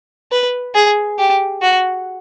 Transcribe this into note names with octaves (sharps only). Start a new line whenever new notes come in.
B4
G#4
G4
F#4